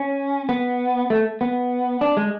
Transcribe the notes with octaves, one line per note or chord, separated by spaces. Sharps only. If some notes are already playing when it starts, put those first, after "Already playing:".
Already playing: C#4
B3
A3
B3
D4
G#3